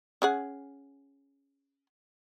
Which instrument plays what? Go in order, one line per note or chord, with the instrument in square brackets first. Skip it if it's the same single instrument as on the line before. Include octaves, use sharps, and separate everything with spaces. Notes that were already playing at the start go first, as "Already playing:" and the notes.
[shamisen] C#4 G#4 F#5